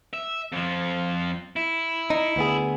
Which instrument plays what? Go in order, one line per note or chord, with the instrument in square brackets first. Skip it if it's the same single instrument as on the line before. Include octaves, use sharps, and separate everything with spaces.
[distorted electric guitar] E5
F2 F3
E4
[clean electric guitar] D#4
D2 B3 G#4